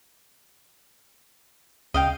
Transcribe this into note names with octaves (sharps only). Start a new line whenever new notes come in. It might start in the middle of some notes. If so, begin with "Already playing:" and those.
C#2 D#5 F5 G5